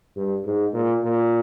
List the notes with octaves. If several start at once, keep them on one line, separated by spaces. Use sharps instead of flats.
G2
G#2
A#2
A#2